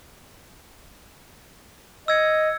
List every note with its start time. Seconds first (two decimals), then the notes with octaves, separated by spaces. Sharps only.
2.08 D#5 E6 G#6 C#7